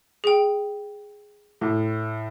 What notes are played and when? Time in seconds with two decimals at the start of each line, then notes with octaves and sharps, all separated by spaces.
0.24 G#4 G5
1.61 A2